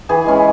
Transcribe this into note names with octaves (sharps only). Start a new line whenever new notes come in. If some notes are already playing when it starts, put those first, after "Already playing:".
E3 G#4
G#3 C#4 E4